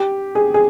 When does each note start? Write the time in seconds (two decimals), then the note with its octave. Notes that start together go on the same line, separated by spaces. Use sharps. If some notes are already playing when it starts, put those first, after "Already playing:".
Already playing: G4
0.35 G#4
0.54 G#4